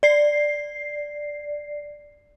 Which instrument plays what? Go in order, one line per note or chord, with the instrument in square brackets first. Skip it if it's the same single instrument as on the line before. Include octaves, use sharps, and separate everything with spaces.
[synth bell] D5 C7